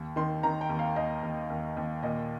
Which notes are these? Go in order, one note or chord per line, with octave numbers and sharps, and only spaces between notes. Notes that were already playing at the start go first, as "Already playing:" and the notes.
Already playing: D#2
D#3 C6
D#3 A#5
G5
D#2
F5
D#2 D#5
D#2
D#2
D#2
A#2 D#5